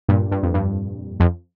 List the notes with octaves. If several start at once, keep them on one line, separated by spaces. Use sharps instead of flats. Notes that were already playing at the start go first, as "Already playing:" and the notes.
G2 A#2
G2
F2
G2
F2